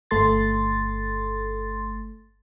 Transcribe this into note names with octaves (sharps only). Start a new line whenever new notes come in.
G1 A3 A4 C6 A6